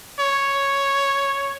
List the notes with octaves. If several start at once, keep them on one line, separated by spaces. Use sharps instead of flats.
C#5